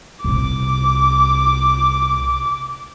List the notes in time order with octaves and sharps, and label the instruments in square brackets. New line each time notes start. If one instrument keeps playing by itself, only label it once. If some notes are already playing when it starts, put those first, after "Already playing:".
[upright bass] C2 C3 [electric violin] D6